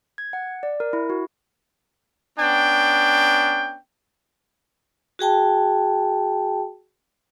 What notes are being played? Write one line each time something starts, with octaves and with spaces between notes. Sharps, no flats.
G#6
F#5
D5
A#4
E4
F#4
B3 C#4 D4 G5
F#4 G#4 G5 A5